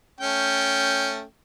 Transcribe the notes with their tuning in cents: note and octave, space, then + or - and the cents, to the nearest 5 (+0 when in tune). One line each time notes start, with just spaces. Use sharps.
A3 +0 C#4 +0 G5 +0